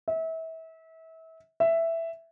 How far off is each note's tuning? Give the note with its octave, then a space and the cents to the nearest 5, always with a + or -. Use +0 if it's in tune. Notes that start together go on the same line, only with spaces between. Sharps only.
E5 -30
E5 +5